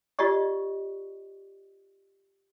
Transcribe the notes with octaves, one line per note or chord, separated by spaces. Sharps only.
F4 G4 D5 D#5 C#6